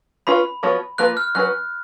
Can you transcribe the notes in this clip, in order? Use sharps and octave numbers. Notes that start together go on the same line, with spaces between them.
C#4 F4 B4 B5
F3 B3 F#4 C#5
F3 A#3 F4 B4 F#6
F6
F#3 C#4 G#4 B4 F#6